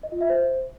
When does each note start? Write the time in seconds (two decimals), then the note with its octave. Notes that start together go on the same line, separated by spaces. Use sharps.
0.03 D#5
0.12 F4
0.21 E5
0.29 C5